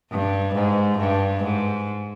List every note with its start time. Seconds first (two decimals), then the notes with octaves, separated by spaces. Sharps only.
0.11 G2
0.55 G#2
0.99 G2
1.43 G#2